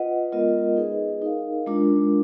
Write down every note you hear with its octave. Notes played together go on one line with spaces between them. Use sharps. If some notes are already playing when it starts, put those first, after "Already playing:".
Already playing: F4 B4 D#5 F#5
G#3 B3 F4 A#4 D#5
D#4 G#4 B4 D#5
D#4 A#4 F5
G#3 D4 F4 A#4